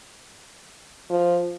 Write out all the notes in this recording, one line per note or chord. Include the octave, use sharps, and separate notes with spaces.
F3